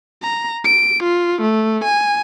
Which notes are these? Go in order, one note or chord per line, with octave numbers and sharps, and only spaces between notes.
A#5
D7
F4
A3
G#5